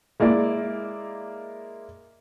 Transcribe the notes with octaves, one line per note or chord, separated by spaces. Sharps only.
G#3 A#3 E4 D5